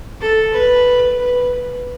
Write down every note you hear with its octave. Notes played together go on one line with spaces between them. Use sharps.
A4
B4
B4